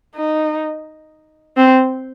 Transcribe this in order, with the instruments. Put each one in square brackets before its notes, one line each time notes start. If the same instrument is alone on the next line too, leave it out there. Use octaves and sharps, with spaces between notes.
[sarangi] D#4
C4